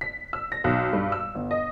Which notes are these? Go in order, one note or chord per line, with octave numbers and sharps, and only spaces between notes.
B6
E6
A#6
B1
G2
E6
G1
D#5